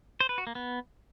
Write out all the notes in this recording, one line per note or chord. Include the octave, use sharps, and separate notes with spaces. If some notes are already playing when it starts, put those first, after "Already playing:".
C5
B4
F#4
A#3
B3